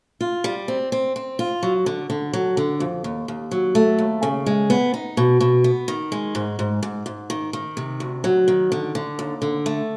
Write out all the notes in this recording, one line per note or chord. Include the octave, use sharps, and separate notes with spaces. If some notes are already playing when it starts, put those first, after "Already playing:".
F4
G3
C4
C4
C4
F4
F#3
D3
D3
F#3
D3
F2
D#2
D#2
F#3
A3
D#2
C#3
G#3
B3
D#4
B2
B2
B3
D#3
G#3
G#2
G#2
G#2
G#2
D#3
D#3
C3
D2
F#3
D#3
D3
D3
D#2
D3
A3